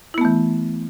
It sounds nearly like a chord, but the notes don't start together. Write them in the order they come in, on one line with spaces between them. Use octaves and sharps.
E4 B3 A3 E3